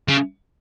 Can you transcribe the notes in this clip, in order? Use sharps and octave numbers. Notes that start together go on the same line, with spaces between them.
C#3